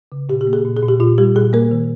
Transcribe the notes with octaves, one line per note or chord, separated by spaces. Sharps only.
C#3
A#2 G4
G4
A#3
G#4
A#2
G#4
A#2
G4
A#2 F4
G3 G4
A#2 G#4
A#3 A#4
D#3